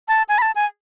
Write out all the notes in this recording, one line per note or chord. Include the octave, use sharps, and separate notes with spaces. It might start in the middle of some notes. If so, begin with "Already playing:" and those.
A5
G#5
B5
A5
G#5